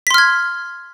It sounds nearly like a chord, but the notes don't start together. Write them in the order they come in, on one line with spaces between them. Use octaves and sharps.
B6 C6 F6 G#6